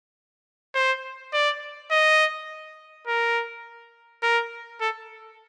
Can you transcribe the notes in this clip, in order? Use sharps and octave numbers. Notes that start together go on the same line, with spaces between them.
C5
D5
D#5
A#4
A#4
A4